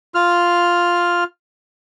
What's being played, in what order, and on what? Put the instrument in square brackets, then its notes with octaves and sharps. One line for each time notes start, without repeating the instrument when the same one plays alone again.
[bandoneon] F4 F6